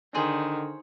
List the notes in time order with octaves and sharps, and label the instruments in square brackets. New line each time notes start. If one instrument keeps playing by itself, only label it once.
[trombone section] D3 [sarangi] D#3 [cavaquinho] G#4 C5 C#5